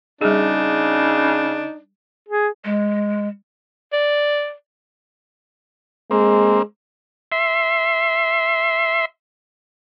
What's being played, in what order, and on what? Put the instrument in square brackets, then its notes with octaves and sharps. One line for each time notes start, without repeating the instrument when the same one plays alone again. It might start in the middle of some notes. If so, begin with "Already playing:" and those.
[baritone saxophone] C#3 [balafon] G3 G#4 [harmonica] D4 [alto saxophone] D#4
[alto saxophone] G#4
[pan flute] G#3
[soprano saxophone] D5
[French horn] G#3 [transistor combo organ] A#3 C4
[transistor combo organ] E5 C6